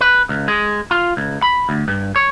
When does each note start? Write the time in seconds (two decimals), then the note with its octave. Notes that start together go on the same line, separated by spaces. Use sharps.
0.01 B4
0.29 C#2
0.48 G#3
0.91 F4
1.17 C#2
1.42 B5
1.69 D2
1.88 G2
2.16 C#5